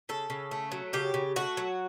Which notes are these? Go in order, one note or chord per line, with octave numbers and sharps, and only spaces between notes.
C#3 A4
C#3
A3
F#3
C#3 G4
C#3
A3 F#4
F#3